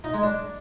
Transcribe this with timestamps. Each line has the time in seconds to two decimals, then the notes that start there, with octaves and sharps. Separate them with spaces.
0.04 D#4
0.13 G#3
0.23 D4